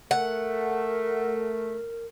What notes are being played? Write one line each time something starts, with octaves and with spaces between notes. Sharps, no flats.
A3 A#4 F#5